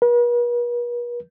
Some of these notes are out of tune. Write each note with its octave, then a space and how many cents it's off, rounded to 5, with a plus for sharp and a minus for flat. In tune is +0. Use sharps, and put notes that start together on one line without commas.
B4 -45